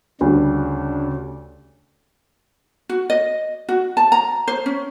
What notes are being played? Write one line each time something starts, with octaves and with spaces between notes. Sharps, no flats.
D2 C#3 G3 C#4 D4
F#4
D#5
F#4
A5
A#5
C5
C#4